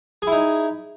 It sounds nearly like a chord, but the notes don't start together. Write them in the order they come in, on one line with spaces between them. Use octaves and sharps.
G#4 E4 D#4